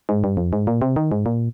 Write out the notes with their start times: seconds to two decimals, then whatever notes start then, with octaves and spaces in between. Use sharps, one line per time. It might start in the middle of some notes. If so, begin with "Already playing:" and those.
0.09 G#2
0.24 G2
0.37 F2
0.53 G#2
0.67 A#2
0.82 C3
0.96 D#3
1.12 G#2
1.26 A#2